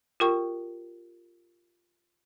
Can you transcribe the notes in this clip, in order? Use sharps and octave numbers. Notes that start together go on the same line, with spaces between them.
F4 G4 A#4 G5 C#6